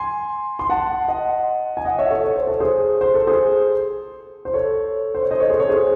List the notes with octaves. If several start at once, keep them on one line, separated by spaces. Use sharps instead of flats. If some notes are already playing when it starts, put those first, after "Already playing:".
Already playing: G#5 C6
C6
F#5 A5
D#5 F#5
G#5
D#5 F#5
C#5 E5
A4 C#5
C#5
C5
A4
G#4 C5
C5
A4
G#4 C5
C5
A4 C#5
C5
C#5
C5 D#5
A4 C#5
G#4 C5
A4 C#5
G#4 C5